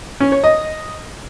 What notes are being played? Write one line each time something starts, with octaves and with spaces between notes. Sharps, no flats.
C#4
C#5
D#5